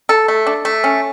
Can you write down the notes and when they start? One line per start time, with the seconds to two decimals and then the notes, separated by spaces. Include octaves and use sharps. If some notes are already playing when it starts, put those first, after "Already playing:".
0.09 A4
0.28 A3
0.47 D4
0.65 A3
0.84 C#4